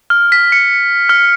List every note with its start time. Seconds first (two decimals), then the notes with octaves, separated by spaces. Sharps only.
0.10 F6
0.32 B6
0.52 C#7
1.09 F6